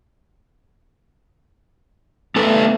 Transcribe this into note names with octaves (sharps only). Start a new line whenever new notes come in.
A3 B3 A4 B4